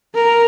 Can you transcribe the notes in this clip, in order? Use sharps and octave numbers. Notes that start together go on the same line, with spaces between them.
A#4